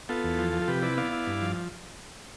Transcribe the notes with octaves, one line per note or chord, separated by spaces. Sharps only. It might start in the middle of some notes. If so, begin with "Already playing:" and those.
B3 F4 A4
E2
F3
F3
A4
C3 G4 B4
E4 B4 D5
B3 D5 F5
E4
G2
F3